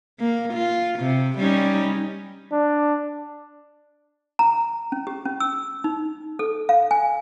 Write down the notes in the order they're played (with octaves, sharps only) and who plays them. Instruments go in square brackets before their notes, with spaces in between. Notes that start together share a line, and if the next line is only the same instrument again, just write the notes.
[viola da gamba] A#3
F4
C3
G3 C#4 D#4
[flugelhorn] D4
[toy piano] A#5
C#4
G4
C#4
E6
D#4
A4
F5
G#5